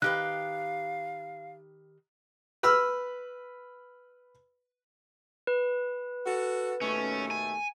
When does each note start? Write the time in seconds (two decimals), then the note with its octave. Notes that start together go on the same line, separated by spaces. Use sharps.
0.02 D#3 G4 B4 F5 F#6
2.63 B4 B5 E6 F6
5.47 B4
6.26 F#4 A4
6.81 D#2 B2 A3 C#4
7.31 G#5